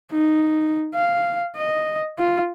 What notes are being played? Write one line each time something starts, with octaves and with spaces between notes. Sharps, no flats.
D#4
F5
D#5
F4